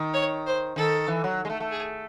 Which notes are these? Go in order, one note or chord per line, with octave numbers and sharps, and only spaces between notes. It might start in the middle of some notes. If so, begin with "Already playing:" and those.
Already playing: D#3
C#5
C5
D#3 A4
E3
F#3
G#3
A3
A3
G#4